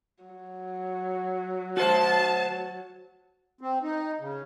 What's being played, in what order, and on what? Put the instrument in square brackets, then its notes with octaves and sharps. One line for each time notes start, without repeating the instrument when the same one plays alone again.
[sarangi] F#3
[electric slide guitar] F#4 C5 [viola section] A5
[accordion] C4
D#4
C#3